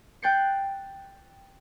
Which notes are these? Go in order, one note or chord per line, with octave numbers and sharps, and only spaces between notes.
G5 F#6 G6 A6 C7 C#7